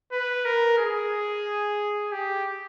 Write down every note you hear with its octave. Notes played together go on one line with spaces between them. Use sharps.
B4
A#4
G#4
G4